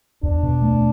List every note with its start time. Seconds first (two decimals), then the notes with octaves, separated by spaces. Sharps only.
0.23 E2 D4
0.43 B2
0.62 A3